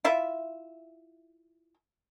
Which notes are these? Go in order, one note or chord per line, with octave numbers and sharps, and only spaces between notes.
E4 F4 E5